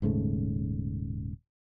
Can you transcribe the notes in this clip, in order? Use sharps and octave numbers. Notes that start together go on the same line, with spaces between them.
D#1 G#2 C#3 A3